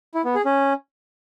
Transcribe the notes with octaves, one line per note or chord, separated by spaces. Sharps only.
E4
B3
G#4
C#4